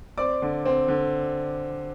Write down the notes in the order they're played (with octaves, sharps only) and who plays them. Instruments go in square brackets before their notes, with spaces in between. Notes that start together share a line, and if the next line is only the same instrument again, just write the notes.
[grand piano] C4 D5 D6
D3
C4
D3